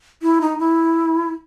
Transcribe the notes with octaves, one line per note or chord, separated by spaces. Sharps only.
E4
D#4
E4